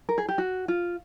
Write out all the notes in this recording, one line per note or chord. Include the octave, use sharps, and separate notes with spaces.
A#4
G#4
G4
F#4
F4